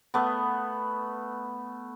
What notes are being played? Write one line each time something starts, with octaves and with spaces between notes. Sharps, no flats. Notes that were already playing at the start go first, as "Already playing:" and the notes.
A3 B3